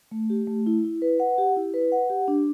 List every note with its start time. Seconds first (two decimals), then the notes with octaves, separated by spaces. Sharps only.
0.11 A3
0.30 G4
0.47 A3
0.66 E4
0.84 E4
1.02 B4
1.20 F#5
1.38 G4
1.57 E4
1.74 B4
1.92 F#5
2.10 G4
2.28 D4